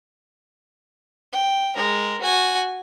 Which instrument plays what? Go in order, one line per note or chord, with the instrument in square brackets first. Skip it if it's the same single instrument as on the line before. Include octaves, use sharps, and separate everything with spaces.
[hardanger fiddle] G5
G#3 A#4
F#4 G#5